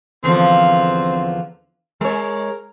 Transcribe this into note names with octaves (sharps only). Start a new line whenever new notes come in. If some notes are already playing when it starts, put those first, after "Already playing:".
E2 D3 F3 C4
G#3 A#4 C#5